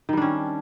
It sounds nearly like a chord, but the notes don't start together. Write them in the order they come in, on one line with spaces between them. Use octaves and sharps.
D#3 G3 D4 C#4